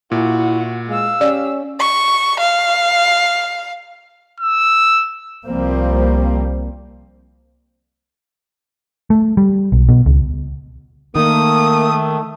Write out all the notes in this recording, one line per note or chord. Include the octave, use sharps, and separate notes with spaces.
A#2 E4 F#4
G#3 F5 E6
C#4 G4 D5
C#6
F5
E6
C2 F3 G3 A#3 C4
A3
G3
B1
B2
C#2
D#3 A3 A#3 D#6